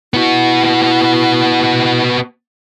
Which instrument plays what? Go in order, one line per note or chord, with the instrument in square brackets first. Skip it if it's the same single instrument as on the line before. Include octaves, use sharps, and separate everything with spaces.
[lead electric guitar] B3 F#4 [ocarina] E4